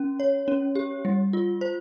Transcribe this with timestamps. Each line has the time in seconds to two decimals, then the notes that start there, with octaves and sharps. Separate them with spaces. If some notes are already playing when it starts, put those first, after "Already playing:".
Already playing: C#4
0.20 C#5
0.48 C#4
0.75 G4
1.05 G3
1.33 F4
1.61 C5